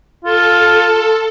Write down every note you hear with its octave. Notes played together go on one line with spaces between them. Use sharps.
F4 A4